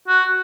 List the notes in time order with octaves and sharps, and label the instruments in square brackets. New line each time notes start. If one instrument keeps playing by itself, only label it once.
[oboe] F#4